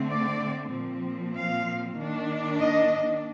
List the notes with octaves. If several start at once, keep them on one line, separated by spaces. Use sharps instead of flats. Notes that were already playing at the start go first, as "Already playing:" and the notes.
Already playing: D3 A3 C4
D5
A#2 F3 C4
F5
D#3 A#3 D4
D#5